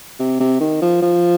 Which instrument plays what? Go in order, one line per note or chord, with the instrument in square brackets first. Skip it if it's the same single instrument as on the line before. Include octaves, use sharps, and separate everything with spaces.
[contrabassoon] C3
C3
D#3
F3
F3